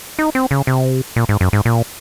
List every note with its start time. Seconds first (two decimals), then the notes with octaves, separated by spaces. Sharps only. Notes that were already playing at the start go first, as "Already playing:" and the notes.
0.19 D#4
0.35 C4
0.51 C#3
0.67 C3
1.16 A#2
1.29 G#2
1.41 F#2
1.53 G#2
1.65 A#2